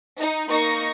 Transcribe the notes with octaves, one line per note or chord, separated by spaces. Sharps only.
D#4
A#3 D#4 C#6 A#6